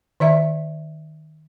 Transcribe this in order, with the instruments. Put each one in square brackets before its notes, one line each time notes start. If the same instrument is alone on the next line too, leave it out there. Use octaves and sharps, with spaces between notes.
[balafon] D#3 D5 E5